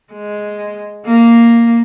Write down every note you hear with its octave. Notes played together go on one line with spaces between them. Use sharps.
G#3
A#3